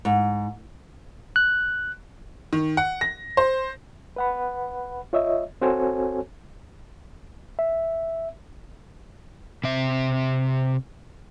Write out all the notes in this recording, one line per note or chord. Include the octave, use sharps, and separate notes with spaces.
G#2
F#6
D#3
F#5
A#6
C5
B4 F#5 B5
F4 C#5 D#5 E5
C4 F#4 A4 C5 C#5 G#5
E5
C3 E5